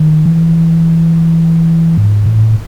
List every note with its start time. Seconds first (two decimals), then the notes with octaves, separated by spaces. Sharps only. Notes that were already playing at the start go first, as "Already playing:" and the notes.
Already playing: D#3
0.26 E3
1.97 G#2
2.26 A2